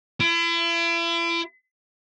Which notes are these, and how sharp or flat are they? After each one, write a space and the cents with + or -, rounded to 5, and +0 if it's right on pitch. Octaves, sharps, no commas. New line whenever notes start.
E4 +40